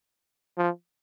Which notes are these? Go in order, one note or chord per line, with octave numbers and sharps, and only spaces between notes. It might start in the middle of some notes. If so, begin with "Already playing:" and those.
F3